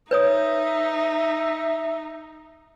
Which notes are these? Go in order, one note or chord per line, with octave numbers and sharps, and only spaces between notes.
D#4 B4 C#5 E5 D#6